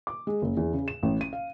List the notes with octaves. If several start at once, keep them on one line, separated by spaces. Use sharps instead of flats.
D6
G#3
F#1
E2
C#3
E7
A1
D#7
F5